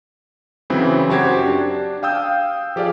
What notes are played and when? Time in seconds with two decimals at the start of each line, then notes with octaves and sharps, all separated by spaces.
0.70 C#3 E3 F#3 C4 E4 G#4
1.09 F#2 F#4 G4 C5 G#6
1.46 D4
2.03 F5 G5 D#6 E6 G6
2.76 F3 G4 G#4 D5 F5